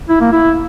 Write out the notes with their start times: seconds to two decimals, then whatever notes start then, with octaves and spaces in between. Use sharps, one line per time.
0.09 E4
0.21 A#3
0.32 E4